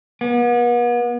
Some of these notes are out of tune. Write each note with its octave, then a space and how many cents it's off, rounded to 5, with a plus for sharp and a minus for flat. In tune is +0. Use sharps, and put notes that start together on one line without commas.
B3 -40